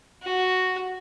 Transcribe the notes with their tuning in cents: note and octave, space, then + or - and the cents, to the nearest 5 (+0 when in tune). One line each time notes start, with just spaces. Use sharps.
F#4 +0